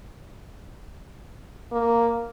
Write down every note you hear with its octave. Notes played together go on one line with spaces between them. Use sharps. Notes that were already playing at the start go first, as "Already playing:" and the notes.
A#3